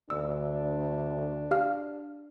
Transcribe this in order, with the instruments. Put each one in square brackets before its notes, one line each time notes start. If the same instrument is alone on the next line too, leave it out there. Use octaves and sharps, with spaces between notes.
[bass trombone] D2 [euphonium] D4 [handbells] E6
[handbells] G4 F5 F6